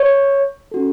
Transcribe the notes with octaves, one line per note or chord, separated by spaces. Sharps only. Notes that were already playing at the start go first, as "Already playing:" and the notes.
Already playing: C#5
C#4 F#4 A4